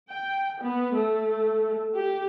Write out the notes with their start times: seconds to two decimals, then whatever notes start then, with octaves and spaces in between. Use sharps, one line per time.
0.10 G5
0.60 B3
0.95 A3
1.96 G4